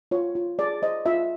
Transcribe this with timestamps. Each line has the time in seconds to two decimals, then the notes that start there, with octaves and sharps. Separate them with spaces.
0.11 F4 C#5
0.35 F4
0.59 G#4 D5
0.82 C5 D#5
1.06 F4 E5